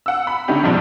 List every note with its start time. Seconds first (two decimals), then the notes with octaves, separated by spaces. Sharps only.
0.06 F#5 E6
0.27 B5
0.48 D3 A3 C#4 D#4 G4
0.63 F2 G#2 B2 F3 G3